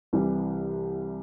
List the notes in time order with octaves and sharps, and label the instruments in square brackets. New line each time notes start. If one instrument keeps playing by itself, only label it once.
[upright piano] C2 C3 E3 G3